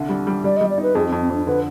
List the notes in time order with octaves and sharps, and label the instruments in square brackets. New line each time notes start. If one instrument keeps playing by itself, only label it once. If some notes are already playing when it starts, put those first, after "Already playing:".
Already playing: [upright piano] C2 D3
G3
G3
[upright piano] G3 [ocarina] D5
[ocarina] D#5
[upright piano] G3
[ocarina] D5
[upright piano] D#4 [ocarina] B4
[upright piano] F2 [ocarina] G#4
[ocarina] C4
[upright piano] F2
[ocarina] C4
[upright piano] F2 [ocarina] D4
[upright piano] D3 [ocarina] B4